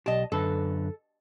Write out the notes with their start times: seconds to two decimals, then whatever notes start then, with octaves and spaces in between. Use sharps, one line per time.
0.06 B1 G4 D#5 A5
0.32 F#2 D3 A4 B4